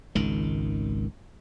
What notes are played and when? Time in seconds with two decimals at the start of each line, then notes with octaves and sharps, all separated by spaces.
0.15 G#1 C#2 D#3